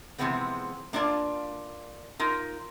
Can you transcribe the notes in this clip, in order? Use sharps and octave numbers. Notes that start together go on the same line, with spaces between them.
C3 E3 F3 G#3 B3 C4
A#3 D4 F4 D5 A5
D#4 F4 A#4